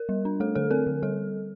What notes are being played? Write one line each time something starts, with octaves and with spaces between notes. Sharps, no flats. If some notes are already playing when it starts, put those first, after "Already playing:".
Already playing: A#4
G3
D4
A3 A4
D3 A4
C4 A#4
D3
G3 A4